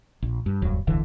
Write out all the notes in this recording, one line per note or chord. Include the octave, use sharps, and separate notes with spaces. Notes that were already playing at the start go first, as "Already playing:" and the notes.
A#1
G2
E1 D2 G2 F#3
D1 B1 D3 E3